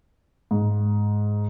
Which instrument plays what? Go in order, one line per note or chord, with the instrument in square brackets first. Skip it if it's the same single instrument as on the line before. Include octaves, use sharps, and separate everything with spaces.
[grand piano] G#2